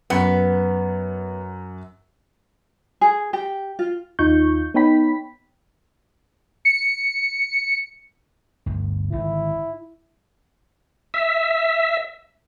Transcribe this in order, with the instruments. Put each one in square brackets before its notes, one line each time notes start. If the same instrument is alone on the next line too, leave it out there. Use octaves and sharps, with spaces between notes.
[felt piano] F#2 F#5 C#7 [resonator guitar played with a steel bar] B3
[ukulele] G#4
G4
F4
[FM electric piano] D#2 D#4 F4 C#6 G6
B3 D#4 C#5 G5 B5 B6
[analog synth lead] C#7
[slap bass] G1 D2
[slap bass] G#1 D3 [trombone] E4
[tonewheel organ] E5